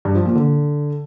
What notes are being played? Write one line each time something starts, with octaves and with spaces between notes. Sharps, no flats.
G2
F3
A#2
D3